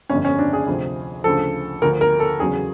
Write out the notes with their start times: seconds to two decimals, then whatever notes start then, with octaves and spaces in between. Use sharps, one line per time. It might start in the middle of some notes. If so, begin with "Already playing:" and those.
0.10 G1 F2 D3 C#4
0.25 C#4
0.39 D4
0.53 G#4
0.67 D2 C3 F3
1.24 D2 C#3 F3 A4
1.82 D2 D3 F3 A#4
2.01 A#4
2.20 A4
2.40 E2 C#3 F#3 G#4